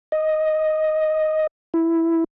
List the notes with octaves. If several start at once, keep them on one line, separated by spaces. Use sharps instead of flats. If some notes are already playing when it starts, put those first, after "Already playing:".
D#5
E4